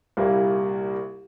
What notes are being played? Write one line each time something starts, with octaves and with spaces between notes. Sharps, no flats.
C2 A#2 G3 A#3 E4